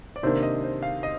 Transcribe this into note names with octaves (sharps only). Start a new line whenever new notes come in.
D5
C3 D#3 A#3 D4 C5
D#5
C5
F5
D#5